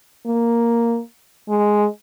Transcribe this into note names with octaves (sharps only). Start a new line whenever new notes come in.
A#3
G#3